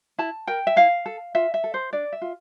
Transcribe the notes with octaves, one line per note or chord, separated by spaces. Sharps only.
E4 A5
A#4 G5
E5
E4 F5
A4
F4 E5
E5
A4
C5
D4 D5
E5
F4